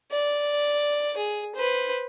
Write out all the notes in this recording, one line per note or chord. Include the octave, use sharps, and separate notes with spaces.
D5
G#4
B4 C5